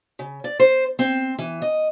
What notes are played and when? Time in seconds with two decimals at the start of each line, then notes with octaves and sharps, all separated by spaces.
0.19 C#3
0.44 D5
0.60 C5
0.99 C4
1.39 E3
1.62 D#5